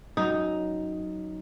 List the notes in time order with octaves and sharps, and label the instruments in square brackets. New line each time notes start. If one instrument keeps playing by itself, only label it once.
[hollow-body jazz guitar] F#2 [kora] D#4